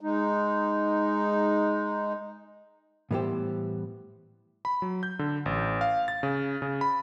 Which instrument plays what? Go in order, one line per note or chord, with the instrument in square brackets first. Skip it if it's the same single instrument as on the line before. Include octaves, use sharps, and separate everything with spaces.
[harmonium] G#3 D#4
[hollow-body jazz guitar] A2 E3 G3 B3 G4 C5
[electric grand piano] B5
F#3
G6
D3
A1
F5
A6
C#3
C#3
B5